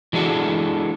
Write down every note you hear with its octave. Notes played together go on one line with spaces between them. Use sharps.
E3 G#3 D4 F#4 A4